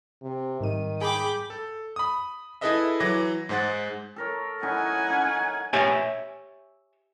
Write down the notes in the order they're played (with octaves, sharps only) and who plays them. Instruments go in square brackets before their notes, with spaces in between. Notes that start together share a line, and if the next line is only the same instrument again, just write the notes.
[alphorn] C3
[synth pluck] G#2 G3 D#7 [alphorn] D#3
[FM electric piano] G#4 [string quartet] G5 B5 D6
[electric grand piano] A4
B5 D#6
E4 G#4 A4 B4 D#5 E5
E3 F#3 D6 A#6
G#2 G#3 C5 F#5 A6
[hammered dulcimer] A4 A#4 C#5
[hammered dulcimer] C#4 D#4 E4 [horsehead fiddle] F#5 G#5
[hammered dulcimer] C#4 D#4
[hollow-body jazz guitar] G4 C#5 E5 G#5